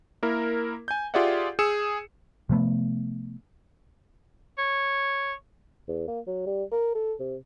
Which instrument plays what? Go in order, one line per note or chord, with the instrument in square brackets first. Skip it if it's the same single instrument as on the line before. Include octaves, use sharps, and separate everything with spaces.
[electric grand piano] A#3 E4 A#4
G#5 G6
F4 G4 G#4 D5 E5 F#5
G#4 E6 C#7 E7
[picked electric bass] C3 F3 A3 B3
[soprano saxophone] C#5
[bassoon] E2
A#3
F#3
G3
A#4
A4
C3